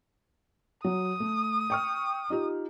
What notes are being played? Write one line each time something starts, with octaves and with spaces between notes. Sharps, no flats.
F#3 D#6
A3
G5 C#6 F6
D#4 F4 G4